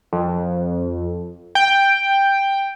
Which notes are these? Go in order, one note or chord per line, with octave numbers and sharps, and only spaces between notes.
F2
G5